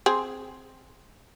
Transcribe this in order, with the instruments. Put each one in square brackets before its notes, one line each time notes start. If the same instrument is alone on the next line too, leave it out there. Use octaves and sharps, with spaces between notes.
[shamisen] C4 G#4